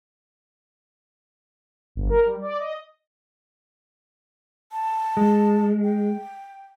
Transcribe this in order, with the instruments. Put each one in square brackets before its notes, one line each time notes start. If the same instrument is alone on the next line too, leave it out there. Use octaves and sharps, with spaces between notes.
[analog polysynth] G1
A#4
G3
D5
D#5
[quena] A5
[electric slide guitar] G#3
[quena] G5